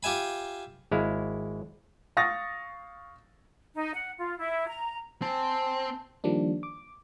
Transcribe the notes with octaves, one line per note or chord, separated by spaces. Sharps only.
F4 G4 E5 G#5 B5
G#1 G#3 E4 F5
F5 C#6 D#6 A6 A#6
D#4
F#5
F4
E4
A#5
C4 G#5 A5
D#3 F3 G3 A#3 D4
D6